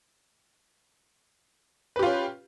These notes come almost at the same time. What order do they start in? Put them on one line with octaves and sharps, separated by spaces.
B4 G4 F4 C#4